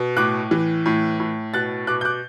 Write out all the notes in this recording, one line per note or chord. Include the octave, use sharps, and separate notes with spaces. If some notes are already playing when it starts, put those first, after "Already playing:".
Already playing: B2
A2 D6 F#6
E3
A2
A2
B2 F#6 A6
B2 D6 F#6
G6
D6 F#6